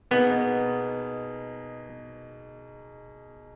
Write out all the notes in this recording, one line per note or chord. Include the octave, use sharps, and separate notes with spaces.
B2 A#3 B3 D#4 G#4